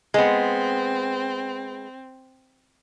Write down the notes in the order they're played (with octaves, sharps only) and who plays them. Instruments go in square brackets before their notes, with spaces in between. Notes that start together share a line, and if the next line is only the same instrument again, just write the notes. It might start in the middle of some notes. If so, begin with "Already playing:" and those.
[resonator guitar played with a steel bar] G#3 B3 [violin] C4